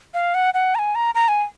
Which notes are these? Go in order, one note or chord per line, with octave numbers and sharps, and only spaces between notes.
F5
F#5
F#5
A#5
G#5
A#5
A#5
G#5